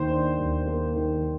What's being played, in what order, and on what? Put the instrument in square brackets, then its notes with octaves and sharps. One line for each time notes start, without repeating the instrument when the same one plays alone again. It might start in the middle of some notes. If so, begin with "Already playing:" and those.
Already playing: [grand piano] D#2 D#3 A#3 [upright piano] C5
[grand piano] D4
D#2
A#3
D#3